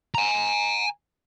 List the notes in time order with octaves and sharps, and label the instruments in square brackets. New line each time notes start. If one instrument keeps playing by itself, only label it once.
[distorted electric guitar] G#5 A#5